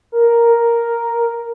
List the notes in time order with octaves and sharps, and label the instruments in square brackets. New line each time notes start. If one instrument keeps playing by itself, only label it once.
[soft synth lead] A#4